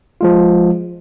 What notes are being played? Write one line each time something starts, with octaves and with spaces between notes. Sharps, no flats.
F3 G#3 F4